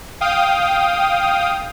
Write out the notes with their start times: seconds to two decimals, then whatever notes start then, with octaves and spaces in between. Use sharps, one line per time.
0.21 F5 G5 D#6